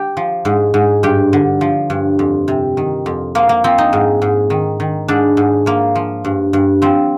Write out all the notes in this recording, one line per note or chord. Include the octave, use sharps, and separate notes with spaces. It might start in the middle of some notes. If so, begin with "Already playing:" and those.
Already playing: G4
F3
G#2
G#2
G2 G4
D3
F3
G2
F2
C3
D#3
F2
F3 A#3
A#3
F3 C4
D#4
G#2
G#2
D#3
D#3
G#2 D4
G#2
F3 A#3
F3
G2
G2
F3 C4